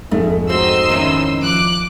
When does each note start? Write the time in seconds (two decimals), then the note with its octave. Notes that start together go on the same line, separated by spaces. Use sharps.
0.11 F2 G#2 G#3 A3
0.49 C4 D#4 F#4 C6 E6
0.89 D#3 C#4 E4
1.42 F3 D6 F#6